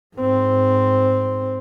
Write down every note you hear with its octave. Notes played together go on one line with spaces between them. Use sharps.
G#2 C4